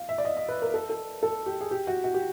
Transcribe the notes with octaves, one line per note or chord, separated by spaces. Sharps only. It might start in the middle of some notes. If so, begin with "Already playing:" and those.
Already playing: F5
E5
D5
D#5
D#5
B4
A#4
A4
A4
A4
G4
G#4
G4
F#4
F#4
G4